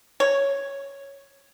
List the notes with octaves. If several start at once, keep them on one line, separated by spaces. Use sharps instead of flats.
C#5